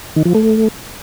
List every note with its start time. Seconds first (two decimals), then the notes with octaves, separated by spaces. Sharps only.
0.16 D#3
0.25 F3
0.35 A3